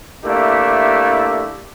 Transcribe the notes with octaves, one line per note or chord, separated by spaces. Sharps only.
A3 A#3 D4 E4 G4